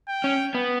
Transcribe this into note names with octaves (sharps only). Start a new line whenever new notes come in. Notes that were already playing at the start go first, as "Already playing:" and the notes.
G5
C#4
B3